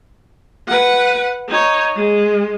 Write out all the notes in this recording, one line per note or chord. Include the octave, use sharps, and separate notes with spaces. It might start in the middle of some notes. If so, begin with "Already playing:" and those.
B4 F#5
D#4 C#5
G#3